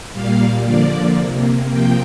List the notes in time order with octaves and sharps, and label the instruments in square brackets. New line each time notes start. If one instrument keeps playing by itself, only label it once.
[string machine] A#2 G3 A#3 F5
D3 F3 A#3 D5
C3
A#3
C3 F3 A#3 G5